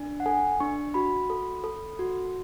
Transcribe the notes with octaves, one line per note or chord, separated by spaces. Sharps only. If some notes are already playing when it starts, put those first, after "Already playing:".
Already playing: D4
F#5
A4 G#5
D4 C#6
F#4 B5
A4
A4
F#4